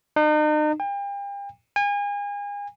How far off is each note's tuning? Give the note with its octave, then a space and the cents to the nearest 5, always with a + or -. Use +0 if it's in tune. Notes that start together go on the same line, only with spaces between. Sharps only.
D#4 -40
G5 +40
G#5 -35